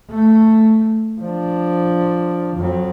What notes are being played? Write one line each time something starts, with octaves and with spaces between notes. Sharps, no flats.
A3
F3 D4
F2 F#3